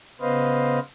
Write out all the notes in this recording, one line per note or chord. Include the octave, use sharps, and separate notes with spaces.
C#3 B3 B4 C5 D#5 F5